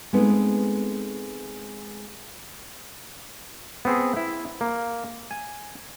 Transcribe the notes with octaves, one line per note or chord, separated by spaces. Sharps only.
G#3 A3 B3 C4 D#4
B3 C4 G#4
E4
A#3
G#5